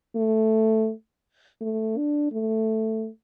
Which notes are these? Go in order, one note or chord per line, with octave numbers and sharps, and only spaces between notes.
A3
A3
D4
A3